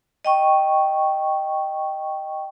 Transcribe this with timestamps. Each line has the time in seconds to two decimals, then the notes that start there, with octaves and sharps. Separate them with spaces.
0.25 D#5 G5 C#6